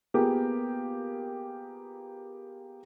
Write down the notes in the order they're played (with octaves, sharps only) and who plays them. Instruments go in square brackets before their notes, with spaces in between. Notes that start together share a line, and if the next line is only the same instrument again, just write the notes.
[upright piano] A#3 B3 F4 G4 G#4 A#4